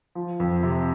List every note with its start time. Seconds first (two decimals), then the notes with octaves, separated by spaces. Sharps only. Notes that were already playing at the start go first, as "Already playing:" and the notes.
0.15 F3
0.40 F2
0.63 C3